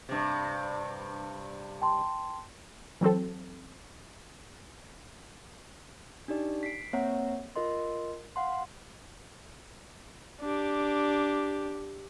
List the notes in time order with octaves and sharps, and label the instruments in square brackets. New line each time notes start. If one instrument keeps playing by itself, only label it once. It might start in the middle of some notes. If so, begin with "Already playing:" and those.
[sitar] G2 C3
[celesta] G5 A5 C6
[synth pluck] E3 F#3 C4 A4
[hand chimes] D4 D#4 G4 D5
B6 C7 D7
A#3 C4 C#5 E5 F#5 A#5
F4 A#4 D#5 C6
F5 F#5 C6
[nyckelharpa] D4 G4